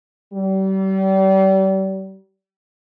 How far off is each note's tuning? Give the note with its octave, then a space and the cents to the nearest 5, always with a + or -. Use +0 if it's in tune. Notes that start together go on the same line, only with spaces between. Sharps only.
G3 -35